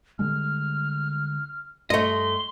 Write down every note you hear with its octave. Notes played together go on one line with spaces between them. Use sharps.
D3 G3 G#3 F6
G2 A3 D#5 C6